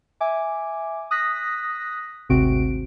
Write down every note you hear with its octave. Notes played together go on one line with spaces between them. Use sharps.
E5 G#5 D6
D#6 F#6 A#6 B6
G#1 D2 C3 C4 F#4 D7